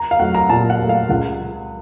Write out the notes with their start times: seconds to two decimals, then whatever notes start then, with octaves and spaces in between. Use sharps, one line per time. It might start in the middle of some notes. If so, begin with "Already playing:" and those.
Already playing: A#5
0.11 F5
0.19 F#3 A3 F#5
0.34 A#5
0.49 A#2 A5
0.70 F#5
0.79 F#3 A3
0.89 F5
1.09 C#2 F#5